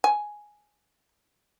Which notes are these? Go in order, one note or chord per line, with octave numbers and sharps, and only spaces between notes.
G#5